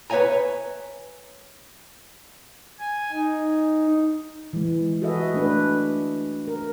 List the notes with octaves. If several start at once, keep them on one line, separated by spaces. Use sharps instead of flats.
B4 C#5 D#5 E5 G#5 A#5
G#5
D#4
E3 G#3
F#4 G#4 A4 B4 D#5 E5
A3 D4 B4
A#4